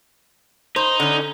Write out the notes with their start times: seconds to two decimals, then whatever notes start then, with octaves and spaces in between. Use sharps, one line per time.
0.76 D#4 C5
1.00 D3 C#4